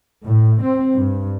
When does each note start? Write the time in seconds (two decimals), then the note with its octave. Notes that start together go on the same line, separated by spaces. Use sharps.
0.25 A2
0.62 C4
0.95 G2